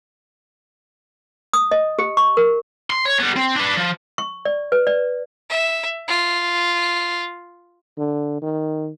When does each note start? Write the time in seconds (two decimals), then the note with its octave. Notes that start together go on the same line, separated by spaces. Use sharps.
1.53 D#6
1.71 D#5
1.99 G4
2.17 C#6
2.37 A#4
2.90 C6
3.05 C#5
3.19 G3 B3
3.36 C4
3.56 D4 B4
3.77 F3
4.18 C#6
4.45 D5
4.72 B4
4.87 D5
5.50 E5
6.08 F4
7.98 D3
8.42 D#3